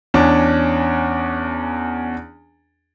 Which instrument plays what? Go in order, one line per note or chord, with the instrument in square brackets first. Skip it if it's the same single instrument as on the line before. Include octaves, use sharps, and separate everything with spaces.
[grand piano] E2 C#4 D4